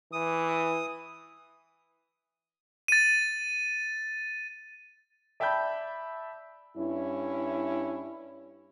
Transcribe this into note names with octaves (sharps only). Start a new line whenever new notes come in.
E3 D#6
A6 D#7
D5 E5 G5 A5 B5 G6
G2 C#4 E4